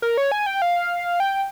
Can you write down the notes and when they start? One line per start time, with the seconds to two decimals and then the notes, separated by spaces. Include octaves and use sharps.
0.02 A#4
0.17 C#5
0.32 G#5
0.46 G5
0.62 F5
1.20 G5